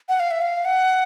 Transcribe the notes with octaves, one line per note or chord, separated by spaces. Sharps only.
F#5
F5
E5
F5
F#5